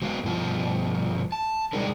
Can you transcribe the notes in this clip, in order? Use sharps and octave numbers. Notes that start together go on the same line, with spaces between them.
F#3 G#3 B3 B4 F5
G2 B2 F3 F4
A5
B2 G3 G#3 D4 D#4 A#4